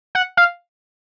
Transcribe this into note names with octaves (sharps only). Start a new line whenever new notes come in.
F#5
F5